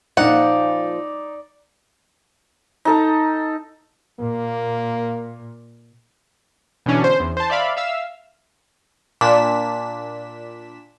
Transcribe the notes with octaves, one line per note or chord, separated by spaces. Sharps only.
A#2 F3 D#4 D5 F#5
D#4 A4 A#5
A#2 A#3
B2 D3 E3 C#4 D4
C5
E2
C5 A5
D5 E5 F5 B5
E5 F5 E6
A#2 D4 B6 E7